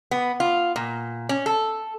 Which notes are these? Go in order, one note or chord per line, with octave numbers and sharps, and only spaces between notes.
B3
F4
A#2
C#4
A4